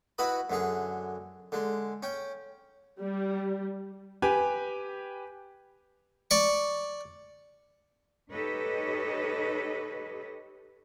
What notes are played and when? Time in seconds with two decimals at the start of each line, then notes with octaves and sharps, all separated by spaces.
0.18 E4 F#4 B4 D#5 B5
0.50 F#2 D3 G#4
1.52 D3 G#3
2.03 C#4 G5
2.99 G3
4.22 G4 B4 G#5
6.31 D5 C#6
8.32 D#4 G4 A4 B4 C#5 D#5